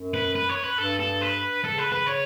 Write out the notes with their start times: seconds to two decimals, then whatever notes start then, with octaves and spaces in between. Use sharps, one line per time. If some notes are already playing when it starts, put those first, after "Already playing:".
Already playing: F#2
0.14 B4
0.35 B4
0.49 C#5
0.64 B4
0.78 G2 A4
1.00 A4
1.22 B4
1.65 C#3 A4
1.79 B4
1.92 B4
2.07 C#5